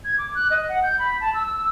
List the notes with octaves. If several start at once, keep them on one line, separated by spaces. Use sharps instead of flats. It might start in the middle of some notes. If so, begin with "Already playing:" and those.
G#6
D6
F#6
D#5
F#5
G6
B5
A5
E6
E6